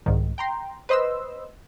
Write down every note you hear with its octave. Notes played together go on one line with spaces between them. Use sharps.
C2 G#2 D#3
G5 A#5 C6
B4 C5 D#5 C6 E6